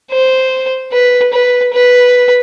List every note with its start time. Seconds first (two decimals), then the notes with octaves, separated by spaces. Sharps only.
0.12 C5
0.93 B4
1.33 B4
1.73 B4